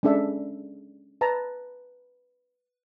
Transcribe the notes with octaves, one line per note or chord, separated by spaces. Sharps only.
G#3 C#4 D4 A4 E5
B4 A5 A#5